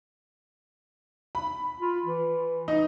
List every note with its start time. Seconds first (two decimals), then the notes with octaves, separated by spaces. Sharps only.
1.35 B5
1.80 F4
2.05 E3
2.68 D#4